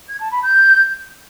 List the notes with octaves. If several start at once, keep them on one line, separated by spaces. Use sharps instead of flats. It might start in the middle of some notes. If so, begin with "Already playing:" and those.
G#6
A5
B5
G6